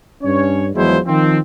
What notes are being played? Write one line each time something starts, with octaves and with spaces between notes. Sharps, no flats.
G2 C#4 C#5
E2 F3 F#3 G#3 E4 C5
D#3 F3 C4